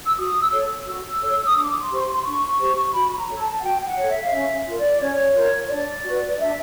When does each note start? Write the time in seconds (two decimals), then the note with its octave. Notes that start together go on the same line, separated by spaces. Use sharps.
0.06 E6
0.17 F#4 D#6
0.41 E6
0.52 A4 C#5
0.87 F#4 E6
1.21 A4 C#5
1.47 D#6
1.55 D4 D6
1.79 C6
1.90 G4 C5 C#6
2.01 C6
2.14 C6
2.24 D4 C#6
2.59 G4 C5
2.94 F#4 B5
3.10 B5
3.17 A#5
3.28 A4 C#5
3.40 A5
3.59 F#5
3.62 F#4 G5
3.78 G5
3.86 F#5
3.97 A4 C#5
4.09 E5
4.22 F5
4.31 C#4 E5
4.66 F4 A#4
4.78 D5
5.01 C#4 C#5
5.35 F4 A#4
5.70 D4 D5
6.04 F#4 B4
6.39 D4 E5